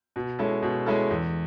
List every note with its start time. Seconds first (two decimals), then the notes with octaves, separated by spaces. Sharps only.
0.16 B2
0.39 G#3 C#4 E4 A4
0.62 B2
0.86 G#3 C#4 E4 A4
1.10 E2